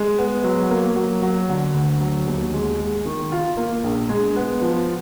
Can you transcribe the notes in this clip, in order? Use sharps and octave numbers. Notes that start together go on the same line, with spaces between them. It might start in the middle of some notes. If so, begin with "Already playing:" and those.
Already playing: G#3
B3
F#3
A#3
F#3
F#3
D3
D2
F#3
D#2
G#3
G#3
D#3
F4
A#3
A#1
G#3
B3
F3